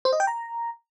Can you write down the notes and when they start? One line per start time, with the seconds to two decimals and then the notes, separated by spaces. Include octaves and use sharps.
0.05 C5
0.13 D#5
0.20 G5
0.27 A#5